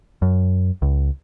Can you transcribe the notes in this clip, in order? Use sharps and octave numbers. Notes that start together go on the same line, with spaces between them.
F#2
C#2